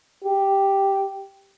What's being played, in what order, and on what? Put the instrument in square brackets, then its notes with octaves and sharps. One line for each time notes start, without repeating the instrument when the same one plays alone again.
[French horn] G4